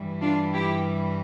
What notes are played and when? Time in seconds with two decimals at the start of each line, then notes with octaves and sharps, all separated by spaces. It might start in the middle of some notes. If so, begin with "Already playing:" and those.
Already playing: G2 E3 G3
0.21 D4 F4
0.53 E4 G4